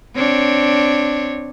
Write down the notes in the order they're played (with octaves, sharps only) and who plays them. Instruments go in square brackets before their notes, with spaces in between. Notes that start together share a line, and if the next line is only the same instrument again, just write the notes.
[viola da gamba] C4 D4 C#5